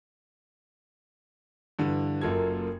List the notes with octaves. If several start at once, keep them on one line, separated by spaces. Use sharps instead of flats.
G2 D3 E3
F#1 F#2 A#3 F4 A4 G#6